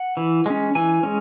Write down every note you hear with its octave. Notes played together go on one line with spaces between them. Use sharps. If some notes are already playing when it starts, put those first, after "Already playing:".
Already playing: F#5
E3
G#3 C#4
E3 G#5
G#3 C#4